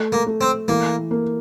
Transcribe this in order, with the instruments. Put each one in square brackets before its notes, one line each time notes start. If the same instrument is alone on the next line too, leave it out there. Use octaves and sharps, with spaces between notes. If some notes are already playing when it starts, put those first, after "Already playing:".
Already playing: [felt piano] A3
[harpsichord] A#3
[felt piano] A3
[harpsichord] C4
[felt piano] E3 [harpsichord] A#3
[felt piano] A#3